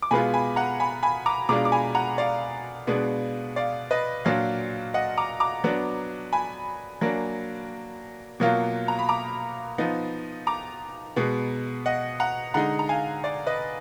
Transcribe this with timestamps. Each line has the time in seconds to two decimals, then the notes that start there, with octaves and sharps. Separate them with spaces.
0.02 D6
0.11 B2 G#3 B3 F4 G#5 B5
0.34 G#5 B5
0.56 F#5 A#5
0.80 G#5 B5
1.03 G#5 B5
1.26 A#5 D6
1.49 B2 G#3 D4 F4 A#5 D6
1.65 D6
1.72 G#5 B5
1.95 F#5 A#5
2.18 D5 F5
2.87 B2 G#3 B3 D4
3.56 D5 F5
3.91 B4 D#5
4.25 A#2 F#3 D4 F4 D5 F5
4.94 D#5 F#5
5.18 A#5 D6
5.40 A#5 D6
5.64 F#3 B3 D4
6.33 G#5 B5
7.01 F#3 A#3 D4
8.40 B2 F#3 A#3 F4
8.88 A#5
8.99 B5
9.09 A#5 D6
9.78 F3 B3 D#4
10.47 A#5 D6
11.16 B2 G#3 B3
11.86 D#5 F#5
12.20 F#5 A#5
12.54 D3 G#3 D#4 F#5 A#5
12.79 A#5
12.89 F5 G#5
13.24 D5
13.47 B4 D#5